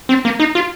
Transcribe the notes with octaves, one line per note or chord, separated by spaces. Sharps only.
C4
A#3
D#4
F4